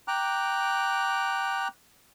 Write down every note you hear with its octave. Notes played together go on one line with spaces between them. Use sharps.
G5 A#5 D6 F#6